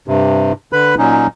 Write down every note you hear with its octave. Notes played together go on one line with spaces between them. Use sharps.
G2 C3
D3 B4 B5
A#2 F#3 C#4 D#4